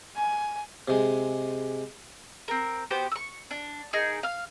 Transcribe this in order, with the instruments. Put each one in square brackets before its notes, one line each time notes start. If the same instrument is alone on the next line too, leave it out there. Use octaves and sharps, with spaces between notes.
[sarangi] G#5
[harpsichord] C3 G#3
[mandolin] C4 A#4
B3 F#4 G4 C5
C#6 E6
D4
D#4 G#4 A#4
F5 F6